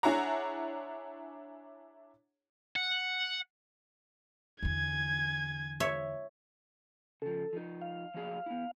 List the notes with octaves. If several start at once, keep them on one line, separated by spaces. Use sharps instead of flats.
D4 E4 G#4 C#5 F#5 A#5
F#5
E2 D3 G#5 G#6
C#5 E5
C#3 F3 A4
F3 D#4
F5
F3 F#3 G#4
B3 E4